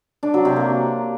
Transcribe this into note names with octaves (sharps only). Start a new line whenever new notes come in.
D4
F#3
C3
A#3